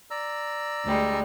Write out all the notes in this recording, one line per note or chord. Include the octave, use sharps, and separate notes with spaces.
D5 A#5 E6
D2 G3 G#3